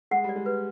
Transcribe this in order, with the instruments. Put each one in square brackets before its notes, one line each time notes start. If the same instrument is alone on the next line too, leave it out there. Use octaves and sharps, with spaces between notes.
[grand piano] G#3 [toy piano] F#5
[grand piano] G3
[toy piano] D5
[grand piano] G#3
[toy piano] B4